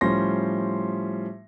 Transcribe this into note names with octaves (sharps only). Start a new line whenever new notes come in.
A2 F3 G3 C#4 C6 A#6